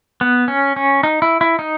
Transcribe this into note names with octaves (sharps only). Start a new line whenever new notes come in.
B3
C#4
C#4
D#4
E4
E4
D#4